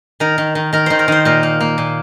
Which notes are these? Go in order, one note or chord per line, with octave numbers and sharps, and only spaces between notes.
D#3 A#4
D#3
D#3
D#3 A#4
D#3 C5
A#4
D#3 C5
A#2 A#4
A#3
A#3
A#2